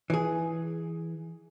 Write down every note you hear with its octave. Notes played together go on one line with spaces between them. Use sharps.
E3 G#4